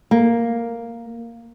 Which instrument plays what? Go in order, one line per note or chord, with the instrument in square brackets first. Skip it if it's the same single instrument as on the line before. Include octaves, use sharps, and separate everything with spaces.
[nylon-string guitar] A#3